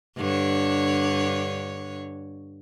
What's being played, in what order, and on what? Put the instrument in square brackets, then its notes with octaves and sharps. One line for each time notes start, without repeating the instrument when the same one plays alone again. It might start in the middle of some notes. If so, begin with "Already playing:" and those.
[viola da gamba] G2 D3 C#5